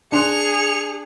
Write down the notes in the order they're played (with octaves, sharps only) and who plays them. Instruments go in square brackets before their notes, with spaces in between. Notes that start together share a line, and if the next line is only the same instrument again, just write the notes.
[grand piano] D4 C6 F#6 [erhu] G#4 [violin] C#7 F7